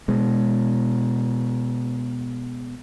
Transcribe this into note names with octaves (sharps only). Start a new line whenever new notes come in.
B2 G#3